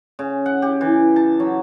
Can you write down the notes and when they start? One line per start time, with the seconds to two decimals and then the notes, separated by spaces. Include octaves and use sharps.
0.19 C#3
0.46 F#5
0.62 G4
0.81 E3
1.16 A5
1.40 F#3